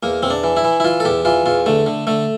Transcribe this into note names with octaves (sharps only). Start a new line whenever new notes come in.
E2 A#3
E2 C4
D4
E3
E4
E3
E4
E3 F4
A4
E2 G4
E3 F4
E2 F4
D3 A3
D3
D3 A3